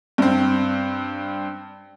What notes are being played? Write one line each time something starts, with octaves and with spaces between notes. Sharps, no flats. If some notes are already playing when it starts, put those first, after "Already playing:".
G2 C4